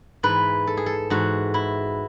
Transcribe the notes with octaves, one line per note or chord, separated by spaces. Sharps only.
G#2 E3 B4
A4
G#4
A4
G#2 E3 F#4
E4